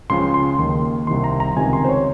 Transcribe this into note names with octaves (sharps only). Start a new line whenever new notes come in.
C#2 C#3 F3 C6
C6
D#2 D#3 C6
C2 C3 D#3 C6
A#5
A#5
C#2 C3 D#3 G#5
C6
C5
C#5